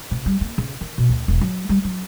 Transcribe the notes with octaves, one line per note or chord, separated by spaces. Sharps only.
C3
G3
A#3
C#3
D#3
B2
D2
E1
F#3
G3
F#3